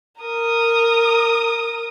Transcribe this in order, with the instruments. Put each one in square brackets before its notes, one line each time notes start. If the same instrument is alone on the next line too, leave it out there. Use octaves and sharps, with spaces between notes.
[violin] A#4 D#6